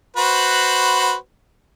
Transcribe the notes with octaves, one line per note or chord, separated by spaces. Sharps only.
F#4 B4 C5